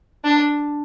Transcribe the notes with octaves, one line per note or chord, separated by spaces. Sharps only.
D4